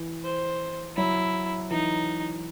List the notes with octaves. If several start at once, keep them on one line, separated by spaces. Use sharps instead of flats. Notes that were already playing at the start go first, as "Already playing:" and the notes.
Already playing: E3
C5
F#3 E4
E3 D#4